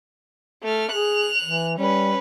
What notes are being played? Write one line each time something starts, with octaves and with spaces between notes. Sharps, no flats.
A3 F6
G#4 F#6 F7
E3
G3 C#4 B4